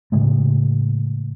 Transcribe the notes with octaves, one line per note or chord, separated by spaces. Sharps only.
A2 C#3 G#3 A3